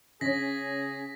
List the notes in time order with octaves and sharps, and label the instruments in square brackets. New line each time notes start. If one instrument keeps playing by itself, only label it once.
[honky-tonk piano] C#3 C#4 [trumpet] G#4 [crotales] A#6 B6